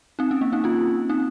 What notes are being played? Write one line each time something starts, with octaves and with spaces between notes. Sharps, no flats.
C4 D#4
C#4
A#3
C4 D#4
C#4 F4
C4 D#4